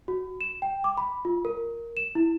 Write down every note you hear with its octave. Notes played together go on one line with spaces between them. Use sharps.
F#4
E7
G5
D6
B5
F4
A#4
E7
E4